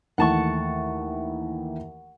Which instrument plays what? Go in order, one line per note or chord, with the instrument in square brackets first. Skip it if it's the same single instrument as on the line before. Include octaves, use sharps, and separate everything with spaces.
[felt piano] D#2 E3 A3 [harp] F#5 A5 C#6